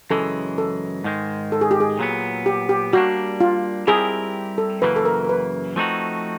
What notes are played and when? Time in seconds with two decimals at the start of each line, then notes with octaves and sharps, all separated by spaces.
0.10 F#2 C#3 E3 G#3 A4
0.58 A4
1.04 G#2 D#3 G#3
1.52 A4
1.61 G#4
1.71 G4
1.80 G#4
1.99 A#2 F#3 B3
2.46 G4
2.69 G4
2.93 G3 A#3 D4 F#4
3.41 F4
3.87 G3 C4 E4 G4 G#4 A#4
4.58 A4
4.82 F#2 C#3 E3 G3 A#3 B4
4.96 A4
5.05 A#4
5.24 A#4
5.29 B4
5.76 F3 A3 C4 D#4 F#4